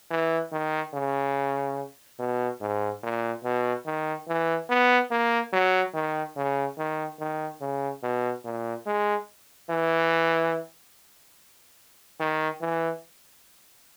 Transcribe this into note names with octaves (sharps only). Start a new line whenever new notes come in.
E3
D#3
C#3
B2
G#2
A#2
B2
D#3
E3
B3
A#3
F#3
D#3
C#3
D#3
D#3
C#3
B2
A#2
G#3
E3
D#3
E3